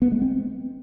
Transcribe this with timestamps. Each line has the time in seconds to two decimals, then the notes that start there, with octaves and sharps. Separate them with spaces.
0.02 B3
0.12 G#3
0.22 C4